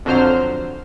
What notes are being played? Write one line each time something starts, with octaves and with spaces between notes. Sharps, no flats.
F2 D3 F#3 C5 F6